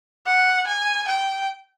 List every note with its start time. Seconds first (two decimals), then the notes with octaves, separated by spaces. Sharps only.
0.26 F#5
0.67 G#5
1.07 G5